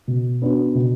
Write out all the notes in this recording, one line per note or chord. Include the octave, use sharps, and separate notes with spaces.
B2
B3 D4 F#4
B2